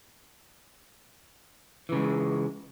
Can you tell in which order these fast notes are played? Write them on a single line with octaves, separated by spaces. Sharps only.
E3 C#3 G#3